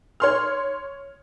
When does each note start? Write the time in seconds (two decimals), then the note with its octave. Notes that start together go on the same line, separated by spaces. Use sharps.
0.20 C#5 C6 F6